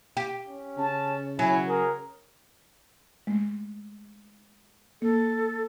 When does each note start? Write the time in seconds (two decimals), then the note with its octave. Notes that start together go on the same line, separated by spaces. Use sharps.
0.17 G4
0.48 C#4
0.78 C#3 A5
1.39 F#3 E4 G#5
1.69 G#4 A#4
3.27 G#3 A3
5.02 A#3 A4